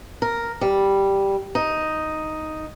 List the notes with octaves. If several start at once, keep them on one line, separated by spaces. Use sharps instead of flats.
A#4
G3
D#4